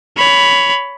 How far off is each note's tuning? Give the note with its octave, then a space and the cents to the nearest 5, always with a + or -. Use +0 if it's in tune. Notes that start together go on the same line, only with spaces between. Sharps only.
C#5 +20 B5 +5